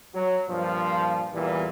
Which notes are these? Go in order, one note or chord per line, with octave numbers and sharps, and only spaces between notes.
F#3
G2 A#2 F3
E2 A#2 E3 G3